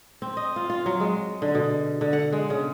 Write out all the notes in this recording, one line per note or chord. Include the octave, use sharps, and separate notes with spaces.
C4
D#5
F4
F4
F#3
G#3
D3
B2
D3
F#5
G#3
C#3